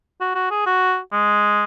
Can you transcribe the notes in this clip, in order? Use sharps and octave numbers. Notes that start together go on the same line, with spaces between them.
F#4
F#4
G#4
F#4
G#3